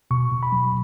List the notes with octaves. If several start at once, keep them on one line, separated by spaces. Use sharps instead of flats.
B2 C#6
B2
B5
F#3